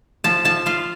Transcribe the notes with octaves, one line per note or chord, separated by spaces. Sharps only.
F3 A5
F3 A5
F4 F5